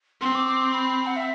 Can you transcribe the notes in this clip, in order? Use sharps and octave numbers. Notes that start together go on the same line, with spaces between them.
C4 C6
D6
D6
C6
B5
F#5
E5